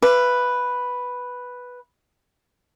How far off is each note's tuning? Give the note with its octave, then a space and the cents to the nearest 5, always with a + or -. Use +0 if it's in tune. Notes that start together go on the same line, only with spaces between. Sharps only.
B4 +0 E5 +45 D6 +0